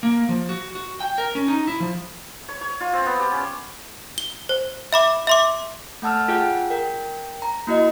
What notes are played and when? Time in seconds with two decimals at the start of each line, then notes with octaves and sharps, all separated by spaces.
0.03 A#3
0.29 F3
0.49 F#4
0.75 F#4
1.00 G5
1.18 A#4
1.35 C#4
1.48 D#4
1.67 E4
1.80 F3
2.48 C#5
2.61 C#5
2.80 F4
2.93 C4
3.06 B3
3.20 G4
3.32 C#4
4.18 G7
4.49 C5
4.93 E5 B5 D6
5.27 E5 C6 D6
6.02 A3 F#5 A5 E6 F6
6.28 F4 G#4 F#5 G5
6.70 A#4 G5
7.42 A#5
7.67 A#3 E4 F#4 D#5